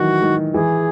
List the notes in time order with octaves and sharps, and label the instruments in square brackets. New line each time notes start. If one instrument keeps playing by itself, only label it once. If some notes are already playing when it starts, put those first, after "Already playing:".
Already playing: [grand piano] D#3 E3 F#3 [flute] F#4
[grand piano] D#3
[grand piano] E3 [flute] G#4